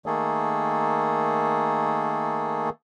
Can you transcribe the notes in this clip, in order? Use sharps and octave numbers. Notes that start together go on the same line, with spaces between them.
D#3 A3 A#3 G#4 A4